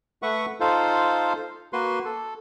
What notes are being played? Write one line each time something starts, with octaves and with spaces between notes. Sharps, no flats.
A3 B4 E5 F#5 C#6
D#4 F4 A4 C5 F5
A#3 F#4 B4 C6
A4